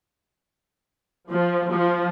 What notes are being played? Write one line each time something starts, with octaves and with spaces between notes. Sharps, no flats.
F3
F3